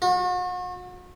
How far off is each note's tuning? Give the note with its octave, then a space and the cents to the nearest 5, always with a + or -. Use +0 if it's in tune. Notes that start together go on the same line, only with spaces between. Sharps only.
F#4 -40